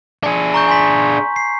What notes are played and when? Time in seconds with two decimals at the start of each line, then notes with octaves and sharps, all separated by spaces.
0.23 D4 G#4
0.54 A#5 C#6 G6
0.68 G#5 C6 B6
1.36 C7